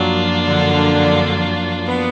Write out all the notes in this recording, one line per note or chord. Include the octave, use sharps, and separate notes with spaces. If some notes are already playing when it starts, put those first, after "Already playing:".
Already playing: F#2 F3 F#3 A#3 D4 F4
D3
B3